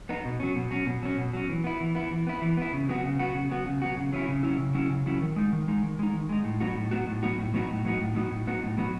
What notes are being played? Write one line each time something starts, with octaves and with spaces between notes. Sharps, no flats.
B3 D#4
B2
F#3 C#4
B2
F#3 C#4
B2
F#3 C#4
B2
F#3 C#4
E3
B3 E4
E3
B3 E4
E3
B3 E4
E3
B3 E4
C#3
F#3 B3 F#4
C#3
F#3 B3 F#4
C#3
F#3 B3 F#4
C#3
F#3 B3 F#4
C#3
F#3 C#4 E4
C#3
F#3 C#4 E4
C#3
F#3 C#4 E4
C#3
F#3 C#4 E4
D#3
G#3 D#4
D#3
G#3 D#4
D#3
G#3 D#4
D#3
G#3 D#4
A2
F#3 B3 D#4 F#4
A2
F#3 B3 D#4 F#4
A2
F#3 B3 D#4 F#4
A2
F#3 B3 D#4 F#4
A2
F#3 B3 D#4 F#4
A2
F#3 B3 D#4 F#4
A2
F#3 B3 D#4 F#4
A2
F#3 B3 D#4 F#4